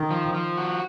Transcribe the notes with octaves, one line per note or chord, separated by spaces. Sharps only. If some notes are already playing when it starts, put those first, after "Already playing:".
Already playing: D#3
F3
F3
F#4